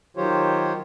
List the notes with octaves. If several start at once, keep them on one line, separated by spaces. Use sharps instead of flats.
D#3 F#3 F4 G4 C5 C#5